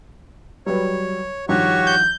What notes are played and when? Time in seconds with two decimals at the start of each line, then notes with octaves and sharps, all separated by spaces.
0.66 F#3 G3 B4 C#5
1.49 G2 D#3 F3 F#4 G4 C#5 C#6
1.86 G6